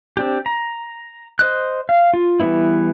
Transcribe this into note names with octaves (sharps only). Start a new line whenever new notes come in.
C4 D4 G4
A#5
C5 D#5 F#6
F5
F4
E3 G3 B3 C4 E4